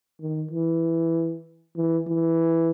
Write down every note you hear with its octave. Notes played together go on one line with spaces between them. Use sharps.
D#3
E3
E3
E3